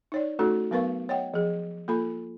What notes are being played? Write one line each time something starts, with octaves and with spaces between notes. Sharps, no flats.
D#4 C#5 D5
A3 C#4 D#4 F#4 A4
F#3 B3 A#4 B4 F5 C#6
C#5 D#5 F#5 G5
F3 G#4
A#3 F4 A4 B5